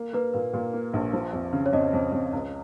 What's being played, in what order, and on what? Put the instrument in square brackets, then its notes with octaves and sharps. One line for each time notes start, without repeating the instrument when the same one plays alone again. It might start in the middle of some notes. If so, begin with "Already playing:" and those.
Already playing: [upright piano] A#3
[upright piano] A#3 [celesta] B4
[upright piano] A#2 [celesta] B4
[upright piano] A#2
A#3
A#1
F3
F2
C#3
[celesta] C#5
[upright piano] F2 [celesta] D#5
[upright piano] F2
F2
C#2